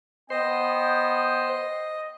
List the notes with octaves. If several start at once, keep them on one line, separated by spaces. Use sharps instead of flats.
B3 C5 D#5 G5